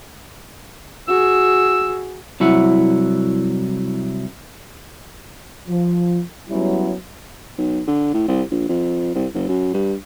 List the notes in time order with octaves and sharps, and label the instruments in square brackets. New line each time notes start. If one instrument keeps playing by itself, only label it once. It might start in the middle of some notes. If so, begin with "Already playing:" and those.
[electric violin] F#4 G#4 [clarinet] E6
[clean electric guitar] C2 F#3 E4 F#5
[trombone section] F3
F#3 G3 B3 C#4 E4
[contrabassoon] B1
D3
A2
C2
A#1
F2
C2
F#1
F#2
G2